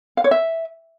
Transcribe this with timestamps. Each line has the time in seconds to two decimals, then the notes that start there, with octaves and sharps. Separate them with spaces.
0.17 F5
0.24 C#5
0.31 E5